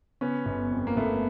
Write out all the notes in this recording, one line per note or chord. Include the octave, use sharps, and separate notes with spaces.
C#3 B3 C#4
G1
F2
A#3
G1 A3 B3